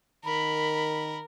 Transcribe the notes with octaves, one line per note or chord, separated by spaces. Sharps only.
D#3 A#4 B5